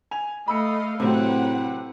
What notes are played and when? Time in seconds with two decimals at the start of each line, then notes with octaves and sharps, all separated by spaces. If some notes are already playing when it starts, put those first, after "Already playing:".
0.11 G#5 F7
0.48 A3 D#5 F5 B5 E6 C#7
1.00 A2 C3 F#3 C4 B4 F#5